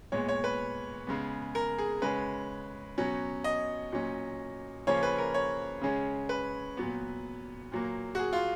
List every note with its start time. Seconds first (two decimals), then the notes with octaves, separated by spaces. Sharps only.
0.12 A#2 G#3 B3 C#5
0.28 C#5
0.44 B4
1.07 C#3 G#3 B3
1.55 A#4
1.78 G#4
2.02 C#3 G#3 C#4 B4
2.98 B2 F#3 C#4
3.44 D#5
3.92 A#2 F#3 C#4
4.87 C#3 F3 A#3 C#4 C#5
5.03 B4
5.18 A#4
5.34 C#5
5.81 C#3 G#3 C#4
6.29 B4
6.77 A#2 F#3 B3
7.72 A#2 F#3 A#3
8.15 F#4
8.19 G#4
8.33 F4